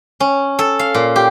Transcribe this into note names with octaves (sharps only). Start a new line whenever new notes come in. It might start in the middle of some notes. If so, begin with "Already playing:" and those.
C#4
A4
F5
A#2
G4